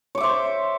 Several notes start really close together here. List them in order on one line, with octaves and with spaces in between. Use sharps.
C#5 D6 E5 C5